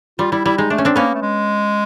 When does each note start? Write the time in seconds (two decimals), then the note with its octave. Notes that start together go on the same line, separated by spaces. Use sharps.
0.19 G3 F4
0.32 G3 E4
0.45 G3 E4
0.58 G#3 D#4
0.70 A3 D4
0.78 C#4
0.85 C4 D4
0.96 A#3 B3 C#4
1.14 A3
1.22 G#3